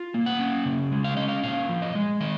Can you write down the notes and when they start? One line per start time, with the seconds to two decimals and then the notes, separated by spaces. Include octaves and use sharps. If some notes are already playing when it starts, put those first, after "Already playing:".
Already playing: F4
0.14 A#3
0.26 F#5
0.40 C#4
0.65 C#3
0.92 G#3
1.04 F5
1.17 C#4 D#5
1.28 F5
1.43 A#2 F5
1.69 F3
1.82 D#5
1.95 G#3
2.20 D#3 D#5